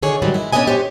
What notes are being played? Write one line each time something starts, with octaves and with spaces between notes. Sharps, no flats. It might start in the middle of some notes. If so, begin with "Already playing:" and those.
D3 D#3 G#4 C#5
G#2 C3 D#3 F#3 G3 C4
G#3 E4
B3 C#4 D4 A4 D#5 G#5
G4 C5 C#5